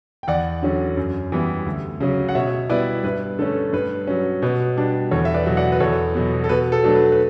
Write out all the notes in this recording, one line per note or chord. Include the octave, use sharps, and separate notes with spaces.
G5
E2 D5 F#5
D3 F#3 C#4
F#2
E3 G3 B3 E4
D2
C#3 F#3 C#4
F#5
B2 C#5 E5
G3 B3 E4 B4 D5
G2 B4
D3 A3 C#4 A4
G2 B4
F#3 C#4
B2 B4
G3 D4
E2 A4 C#5
E5
B4 D5
B2 F#3
D5 F#5
B4
E2 A4 C#5
B2 F#3 B3
A4
B2 B4
A4
F#3 A3 D4
B4
B4